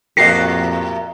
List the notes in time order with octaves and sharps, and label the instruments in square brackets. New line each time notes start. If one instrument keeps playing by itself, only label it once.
[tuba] F2 [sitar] A2 F#4 G4 [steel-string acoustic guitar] A#4 D#5 [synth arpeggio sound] A#6 C7